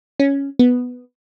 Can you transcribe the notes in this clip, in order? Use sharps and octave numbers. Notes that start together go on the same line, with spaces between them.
C#4
B3